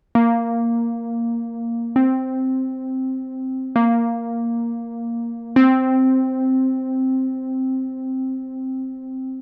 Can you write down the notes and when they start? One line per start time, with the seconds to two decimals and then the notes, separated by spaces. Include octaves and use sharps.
0.15 A#3
1.96 C4
3.76 A#3
5.56 C4